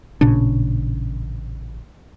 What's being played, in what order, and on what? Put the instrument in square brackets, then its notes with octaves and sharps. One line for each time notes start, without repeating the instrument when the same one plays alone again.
[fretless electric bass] A1 A#2 C#3 D4